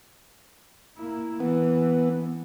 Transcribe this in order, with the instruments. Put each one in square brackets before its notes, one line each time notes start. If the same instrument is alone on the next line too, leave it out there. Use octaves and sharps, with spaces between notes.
[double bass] A#3 E4
[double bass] E3 [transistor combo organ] B3